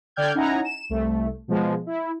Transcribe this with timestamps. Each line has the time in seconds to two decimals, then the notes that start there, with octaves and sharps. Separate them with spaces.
0.16 D3 D5 G5 F6 G6 G#6
0.34 C#4 D#4 E4 F#5 G#5 A#5
0.64 E7
0.90 C2 A3
1.48 B2 F3 G#3
1.86 E4